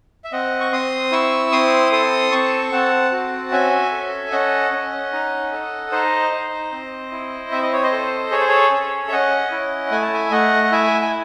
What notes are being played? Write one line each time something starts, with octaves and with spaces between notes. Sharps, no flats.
E5
C4 D#5 F#5
C#6
C4 C6 D#6
E4 C#6 E6
C4 C6 D#6
A4 C6 D#6
C4 A5 C#6
C4 F#5 A5
F#4
C#4 E5 G#5
A4
C#4 D#5 F#5
C#4
D#4
A4
D#4 C5 D#5
D#4
C4
E4
C4 E5
D#5
C#5
C5 D#5
A4
G#4 C#5
C5
A4 C#5
C#4
E5
C#4 D#5 F#5
E4
A3 G#5
A5
E5 G#5
A3 D#5 F#5
F#5
E4 E5 G#5
G#5